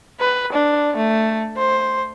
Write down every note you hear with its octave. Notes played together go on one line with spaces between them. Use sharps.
B4
D4
A3
C5